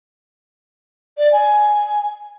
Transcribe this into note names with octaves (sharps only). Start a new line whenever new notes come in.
D5
G#5